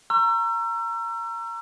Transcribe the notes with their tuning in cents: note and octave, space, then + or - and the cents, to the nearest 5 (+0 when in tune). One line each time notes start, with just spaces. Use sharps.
A#5 -5 C#6 -35 E6 +35